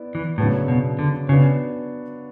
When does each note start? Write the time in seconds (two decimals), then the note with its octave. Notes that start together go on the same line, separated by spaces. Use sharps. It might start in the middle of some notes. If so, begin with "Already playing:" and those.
Already playing: B3 E4 D5
0.15 E3
0.38 A2 C#3 F#3 B3 D4
0.68 B2
0.99 D3
1.28 C#3 B3 D4 F#4 C#5